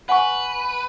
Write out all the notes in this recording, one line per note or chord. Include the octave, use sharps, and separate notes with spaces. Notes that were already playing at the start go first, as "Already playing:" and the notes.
B4 F#5 G#5 C#6